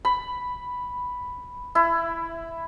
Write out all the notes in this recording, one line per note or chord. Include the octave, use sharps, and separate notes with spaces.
B5
E4